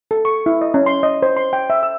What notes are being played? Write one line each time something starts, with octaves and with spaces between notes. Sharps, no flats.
A4
C#6
E4
D#5
C#4
C6
D#5
C5
C6
G5
E5
E6